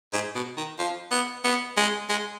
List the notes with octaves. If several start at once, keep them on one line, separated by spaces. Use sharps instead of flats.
G#2
B2
D#3
F3
B3
B3
G#3
G#3